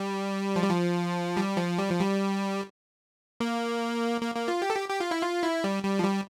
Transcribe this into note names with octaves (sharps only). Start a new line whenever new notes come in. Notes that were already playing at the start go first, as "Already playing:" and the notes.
Already playing: G3
F3
G3
F3
G3
F3
G3
F3
G3
A#3
A#3
A#3
F4
G4
A4
G4
G4
F4
E4
F4
E4
G3
G3
F3
G3